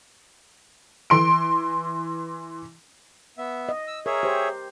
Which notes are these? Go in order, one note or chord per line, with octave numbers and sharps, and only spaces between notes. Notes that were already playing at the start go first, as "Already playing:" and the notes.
E3 C6 D7
B3 E5
D#5
E6
G#4 A#4 C#5 E5
G4 C5